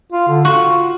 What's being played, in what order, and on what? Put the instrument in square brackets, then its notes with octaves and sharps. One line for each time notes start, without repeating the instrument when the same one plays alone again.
[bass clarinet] F4
D3
[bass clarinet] F4 [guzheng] F#4